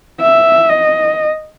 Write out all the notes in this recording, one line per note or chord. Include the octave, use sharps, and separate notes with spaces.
E5
D#5